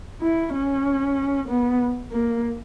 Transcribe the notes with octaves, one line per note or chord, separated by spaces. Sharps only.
E4
C#4
B3
A#3